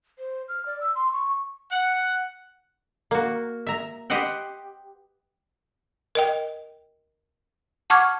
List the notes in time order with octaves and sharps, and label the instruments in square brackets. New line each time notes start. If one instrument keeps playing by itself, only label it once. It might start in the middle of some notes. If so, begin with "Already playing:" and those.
[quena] C5
F6
D5
E6
C6
C#6
[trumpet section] F#5
[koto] A#3 F#4
E5 A#5
G4 B4 C5 D#5 F#5 G5
[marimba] A#4 D#5 G5
F#5 A5 C#6 D6 F6 G#6